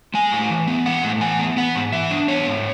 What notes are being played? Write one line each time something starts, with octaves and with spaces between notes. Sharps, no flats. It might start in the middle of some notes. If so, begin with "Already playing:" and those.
G#3 G#5
A2
E3
B3
G#3 F#5
A2
E3 G#5
B3
B3 F#5
G#2
E3 E5
D4
B3 C#5
G#2